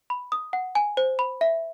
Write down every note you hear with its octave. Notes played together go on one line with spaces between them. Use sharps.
B5
D#6
F#5
G#5
C5
B5
E5